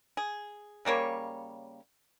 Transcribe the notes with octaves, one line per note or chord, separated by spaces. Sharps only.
G#4
C#3 G3 A#3 C#5